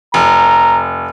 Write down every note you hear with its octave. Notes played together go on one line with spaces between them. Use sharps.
F1 A#5